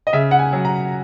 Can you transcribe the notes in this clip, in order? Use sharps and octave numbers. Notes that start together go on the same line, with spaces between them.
D#5
C#3 E5
F#5
G#5
F#3
A#5